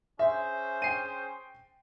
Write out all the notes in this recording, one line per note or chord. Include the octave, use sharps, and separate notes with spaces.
C#4 G#4 C5 E5
G5 C7 D#7